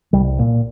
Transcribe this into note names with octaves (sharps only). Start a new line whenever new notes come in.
C2 G3
A#2